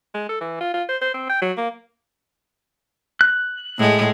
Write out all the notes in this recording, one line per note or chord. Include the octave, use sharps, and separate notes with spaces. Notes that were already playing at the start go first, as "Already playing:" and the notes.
G#3
A4
E3
F4
F4
C5
C5
C4
G5
F#3
A#3
F#6
A2 G#3